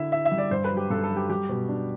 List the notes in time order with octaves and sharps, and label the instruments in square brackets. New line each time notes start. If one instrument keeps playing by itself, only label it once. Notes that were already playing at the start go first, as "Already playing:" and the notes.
Already playing: [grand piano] D3 E4 [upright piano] E5
[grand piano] E4 [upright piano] E5
[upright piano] E5
[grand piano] G3
[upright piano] D5
[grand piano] G2 [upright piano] C5
[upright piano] B4
[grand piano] F#3
[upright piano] G4
[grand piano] G2 [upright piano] A4
[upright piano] A4
[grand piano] F#3
[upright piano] G4
[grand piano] G3 [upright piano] G4
[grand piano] B2
D4